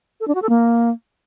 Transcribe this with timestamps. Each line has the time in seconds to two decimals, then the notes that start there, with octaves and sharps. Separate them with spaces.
0.20 A4
0.28 D4
0.35 F#4
0.42 A4
0.49 A#3